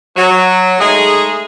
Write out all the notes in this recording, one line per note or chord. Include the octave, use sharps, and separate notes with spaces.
F#3
G#3 A3 D#4 G#4